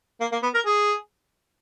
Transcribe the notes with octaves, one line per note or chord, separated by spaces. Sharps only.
A#3
A#3
B3
A#4
G#4